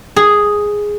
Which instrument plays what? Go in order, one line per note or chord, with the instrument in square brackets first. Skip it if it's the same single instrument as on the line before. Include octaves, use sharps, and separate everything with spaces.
[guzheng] G#4